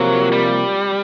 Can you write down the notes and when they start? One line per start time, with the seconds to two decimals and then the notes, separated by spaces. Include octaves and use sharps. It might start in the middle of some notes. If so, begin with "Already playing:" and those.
Already playing: C3 F3 F#3 A#3
0.33 G3